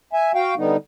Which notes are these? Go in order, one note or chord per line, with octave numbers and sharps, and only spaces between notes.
E5 G#5
F#4 F5 G5
D3 G3 B3 D#4